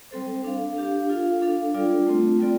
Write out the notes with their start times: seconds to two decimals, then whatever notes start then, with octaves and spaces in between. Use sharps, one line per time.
0.11 G3 C4 A4 C5
0.44 D4 A4 F5
0.77 D4 G4 F5
1.09 F4 A4 F5
1.42 D4 A4 F5
1.74 G3 D4 F4 A4 D5
2.07 A3 C4 F4
2.39 G3 C4 F4 A4 D5